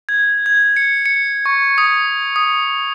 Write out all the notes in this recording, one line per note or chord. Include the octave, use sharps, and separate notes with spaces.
G#6
G#6
C#7
C#7
C#6
D#6
D#6